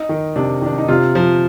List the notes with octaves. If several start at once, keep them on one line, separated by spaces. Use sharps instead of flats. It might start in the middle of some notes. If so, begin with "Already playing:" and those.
Already playing: D#4
D#3
C3 D4
D#3 D4
D#4
C3 F4
F3